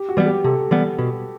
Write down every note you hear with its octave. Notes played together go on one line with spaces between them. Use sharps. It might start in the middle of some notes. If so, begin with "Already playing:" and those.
Already playing: G4
F#4
E3 G3 B3
G4
C3 A4
E3 G3 B3
B2